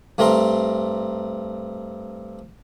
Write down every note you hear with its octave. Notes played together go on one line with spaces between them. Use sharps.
G2 A3 C4 A#4 C6